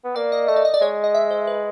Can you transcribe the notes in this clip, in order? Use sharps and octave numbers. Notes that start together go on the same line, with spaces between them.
B3
A#3 D5
D#5
A3 D#5
D5
D#5
D5
G#3 C#5
D#5
E5
C5
B4